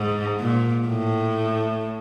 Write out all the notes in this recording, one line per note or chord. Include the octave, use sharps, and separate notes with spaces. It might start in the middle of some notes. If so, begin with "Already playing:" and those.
Already playing: G#2
A#2
A2